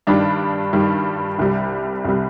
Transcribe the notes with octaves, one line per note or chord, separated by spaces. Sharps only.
G2 D#3 G3 D4
G2 D#3 G3
C2 C3 G3
C2 C3 G3